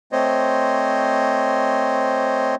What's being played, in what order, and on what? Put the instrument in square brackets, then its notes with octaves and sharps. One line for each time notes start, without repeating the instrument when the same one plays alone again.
[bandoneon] A3 C4 C5 C#5 D#5